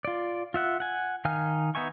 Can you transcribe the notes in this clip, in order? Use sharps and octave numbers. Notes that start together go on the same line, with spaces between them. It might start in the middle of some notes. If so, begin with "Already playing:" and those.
F4 D5
F4 E5 F#5
F#5 G#5
D#3 D#4 F5 G#5 F6
B3 D#4 E5 G#5 C#6